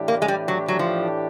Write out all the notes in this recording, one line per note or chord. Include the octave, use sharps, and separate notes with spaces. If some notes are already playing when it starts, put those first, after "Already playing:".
Already playing: A2 E3 A3 D4 G4
A#3
G#3
G3
F#3
F#3
F3